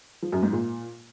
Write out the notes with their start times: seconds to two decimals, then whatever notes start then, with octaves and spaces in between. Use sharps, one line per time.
0.22 F3
0.32 F#2
0.43 G#2
0.53 A#2